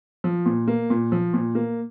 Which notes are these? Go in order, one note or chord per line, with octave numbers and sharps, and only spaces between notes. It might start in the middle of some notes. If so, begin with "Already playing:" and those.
F3
A#2
A#3
A#2
F3
A#2
A#3